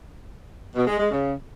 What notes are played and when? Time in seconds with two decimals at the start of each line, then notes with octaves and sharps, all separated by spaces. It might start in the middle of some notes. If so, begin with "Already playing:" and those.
0.75 B2
0.87 G#3
0.99 G#3
1.11 C#3